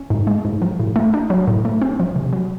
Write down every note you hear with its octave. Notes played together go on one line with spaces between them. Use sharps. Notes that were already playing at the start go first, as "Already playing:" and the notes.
Already playing: C#4
G#2
G#3
G#2
F3
A2
A3
D4
F#3
A2
A3
C4
F3
C3
F#3